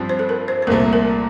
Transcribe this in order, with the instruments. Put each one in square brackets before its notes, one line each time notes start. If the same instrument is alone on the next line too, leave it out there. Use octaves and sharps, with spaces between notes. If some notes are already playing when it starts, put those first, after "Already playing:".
Already playing: [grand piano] G2 F3 C4
[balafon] C5
A4
A#4
C5
C5
[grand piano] C2 A#2 A3 [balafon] A#4
[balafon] A#4